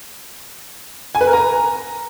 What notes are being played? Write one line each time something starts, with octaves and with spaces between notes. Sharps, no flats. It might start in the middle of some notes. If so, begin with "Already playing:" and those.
G#5
B4
A#4
A#5